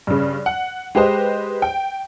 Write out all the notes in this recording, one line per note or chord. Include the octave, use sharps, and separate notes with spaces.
G2 C#3
F#5
G#3 G4 B4 C5 D#5
G5